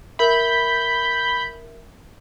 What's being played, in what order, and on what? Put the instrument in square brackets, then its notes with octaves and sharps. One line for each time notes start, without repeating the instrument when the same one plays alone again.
[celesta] A#4 E5 [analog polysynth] B5 G6